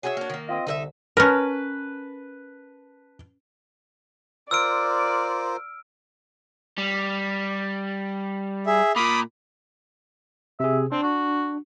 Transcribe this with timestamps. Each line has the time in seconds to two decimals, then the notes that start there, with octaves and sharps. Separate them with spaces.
0.03 F#4 G#4 A#4 C#5 E5
0.17 A#3 D4
0.30 D#3 A#3
0.49 C4 F4 D#5
0.67 C2 D3 D#4 E4 E5
1.17 C#4 A#4 B4 A5
4.51 F4 A#4 C5 D5 E6 F6 D7
6.78 G3
8.66 G#4 E5
8.96 A#2 A#3 B5 D6 D#6
10.60 C3 G#4 E5
10.92 C4 D4
11.03 F#4